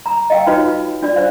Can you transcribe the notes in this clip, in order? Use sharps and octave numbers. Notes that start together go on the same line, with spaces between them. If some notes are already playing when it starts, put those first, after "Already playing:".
A#5
D#5 F5 G5
D#4 F4 F#4 B4 C#5 D#5
F4
D4 F4 D5
C5 D5 F5